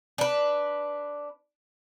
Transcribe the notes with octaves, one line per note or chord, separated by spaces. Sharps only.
D4 B4